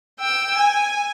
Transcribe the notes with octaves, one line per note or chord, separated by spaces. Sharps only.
G5 E6
G#5